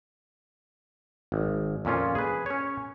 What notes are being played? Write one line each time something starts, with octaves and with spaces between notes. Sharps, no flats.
G#1
F2 A#2 C#4 F4
G#4 B4
C#4 C#5